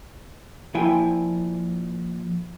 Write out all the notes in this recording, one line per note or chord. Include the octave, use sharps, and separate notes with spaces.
A#2 F3 E4 G5 G#5 C6